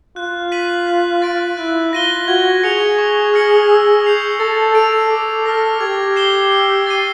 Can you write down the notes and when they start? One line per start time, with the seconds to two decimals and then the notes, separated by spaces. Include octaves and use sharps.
0.16 F4 F#6
0.52 B6 D#7 F#7
0.87 F#6
1.22 A6 D7
1.57 E4 F#6
1.93 F4 A#6 D#7 G7
2.28 F#4 G#6
2.63 G#4 C#7 F7
2.98 C#6
3.33 F6 A#6 C#7 F#7
3.69 E6
4.04 G6 C7 F7
4.40 A4 A6
4.75 A4 D7 F7
5.10 A4 D6
5.45 A4 F6 A#6
5.80 G4 G#6
6.16 C7 E7 G7
6.52 E6
6.86 A6 C7 D#7